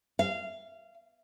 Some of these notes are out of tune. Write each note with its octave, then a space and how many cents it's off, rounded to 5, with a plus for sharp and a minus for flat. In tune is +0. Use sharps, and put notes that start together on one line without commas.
F5 -20